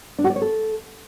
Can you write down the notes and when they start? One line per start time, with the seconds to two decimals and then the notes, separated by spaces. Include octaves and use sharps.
0.18 D4
0.24 F#4
0.30 D5
0.36 C#5
0.42 A4